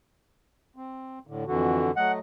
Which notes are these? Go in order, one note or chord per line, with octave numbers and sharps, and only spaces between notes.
C4
A2 D3
F2 D3 E3 F#4
F#3 A3 D#5 F#5